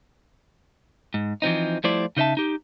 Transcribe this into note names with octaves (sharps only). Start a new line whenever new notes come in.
G#2
E3 F3 C4 D#4
F3 G3 A3 E4 C5 D5
C#3 D#4 C#5 E5 A5
D#4 G4